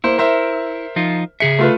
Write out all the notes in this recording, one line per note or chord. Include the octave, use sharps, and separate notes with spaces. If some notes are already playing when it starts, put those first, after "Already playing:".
A#3 E4 C5
A#4 C5 E5
F3 D#4 F4
C#3 G#4 E5 C#7
A3 F4 B4